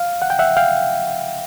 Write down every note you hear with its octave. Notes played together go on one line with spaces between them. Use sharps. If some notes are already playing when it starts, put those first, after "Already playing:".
Already playing: F5
F#5
G5
E5 F#5
F5 G5